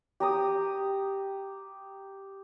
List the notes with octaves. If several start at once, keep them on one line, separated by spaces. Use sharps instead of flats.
G4 A#5 D#6